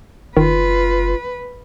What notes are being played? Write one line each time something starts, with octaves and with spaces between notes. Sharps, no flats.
F#1 D#3 F4 B4